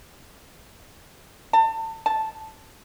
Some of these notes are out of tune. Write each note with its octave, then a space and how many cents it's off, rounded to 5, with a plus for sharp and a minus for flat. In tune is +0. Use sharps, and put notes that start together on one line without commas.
A5 +30
A5 -5